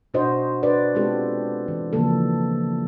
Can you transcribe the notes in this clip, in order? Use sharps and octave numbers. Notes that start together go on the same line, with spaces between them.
B2 D4 F#4 C5 D#5
D4 F#4 B4 D5
G#3 B3 C4 F4 G4 A4
E3
C#3 E3 F3 A#3 A4